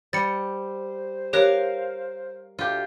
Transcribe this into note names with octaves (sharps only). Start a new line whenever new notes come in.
G3 C5 A6 C#7
G4 A#4 C#5 F5 F#6
D2 F4 G4